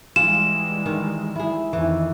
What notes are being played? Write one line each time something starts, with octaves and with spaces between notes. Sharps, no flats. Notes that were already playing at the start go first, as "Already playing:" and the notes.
E3 G3 G#3 F4 G#4 E7
D#3
E4 G#4
F2 D#3 E3